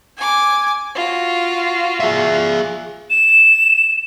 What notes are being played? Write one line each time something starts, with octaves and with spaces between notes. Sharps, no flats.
G#5 D6
F4 F#4
G#4 E5
E7